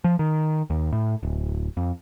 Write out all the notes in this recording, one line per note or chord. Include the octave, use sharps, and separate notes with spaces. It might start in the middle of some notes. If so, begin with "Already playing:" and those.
F3
D#3
D#2
A2
D1
F2